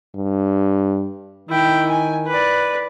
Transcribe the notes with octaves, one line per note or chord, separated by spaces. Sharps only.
G2
D#3 E4 G5
G#5
B4 D5